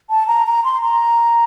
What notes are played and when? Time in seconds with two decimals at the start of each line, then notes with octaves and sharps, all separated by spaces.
0.10 A5
0.28 A#5
0.47 A#5
0.64 C6
0.82 A#5